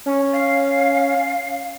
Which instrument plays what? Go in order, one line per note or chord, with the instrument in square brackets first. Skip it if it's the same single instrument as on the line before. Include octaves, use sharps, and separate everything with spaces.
[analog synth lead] C#4
[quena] F5